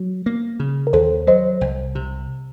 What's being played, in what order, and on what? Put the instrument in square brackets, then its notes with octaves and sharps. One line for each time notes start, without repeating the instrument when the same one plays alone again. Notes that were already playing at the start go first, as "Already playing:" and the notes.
Already playing: [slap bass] F#3
A#3
C#3
[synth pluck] A#4
[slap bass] D#2 [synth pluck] A4 C5
[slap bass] F#3 [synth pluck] C5 D#5
[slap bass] C2
C3